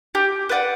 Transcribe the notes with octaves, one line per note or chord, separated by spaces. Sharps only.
G4
B4 D5 F#5